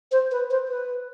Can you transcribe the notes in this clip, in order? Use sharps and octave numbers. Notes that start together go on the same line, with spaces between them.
C5
B4
C5
B4